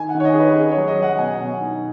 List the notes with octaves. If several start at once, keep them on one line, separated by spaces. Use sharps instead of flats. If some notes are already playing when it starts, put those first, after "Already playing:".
Already playing: D#3 G#5
F#5
D#3
C#5
D#5
G#4
D#4 B4
C#4 G#4
C#5
F#3
D#5
F#3 F#5
B2 G#5
B2
D#4